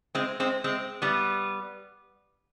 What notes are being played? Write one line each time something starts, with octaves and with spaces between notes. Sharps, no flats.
G#3 C4
G#3 C4
G#3 C4
G3 B3